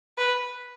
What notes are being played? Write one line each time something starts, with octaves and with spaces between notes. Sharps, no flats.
B4